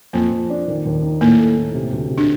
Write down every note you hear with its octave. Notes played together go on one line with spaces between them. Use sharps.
F2 A#3
F2
D4
D#3
D#2
D#4
A2 A#3
A4
A2
C3
D2
C3
D4